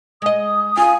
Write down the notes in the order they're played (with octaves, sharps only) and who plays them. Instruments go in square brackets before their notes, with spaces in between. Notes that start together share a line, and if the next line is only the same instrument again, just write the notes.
[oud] G#3 D#5 [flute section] D#6
[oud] C#4 F4 [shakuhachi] G#5